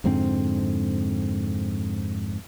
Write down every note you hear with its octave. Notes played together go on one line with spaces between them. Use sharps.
F2 G#2 D3 C4